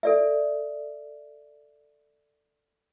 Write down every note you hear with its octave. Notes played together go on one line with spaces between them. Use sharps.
A4 D5 E5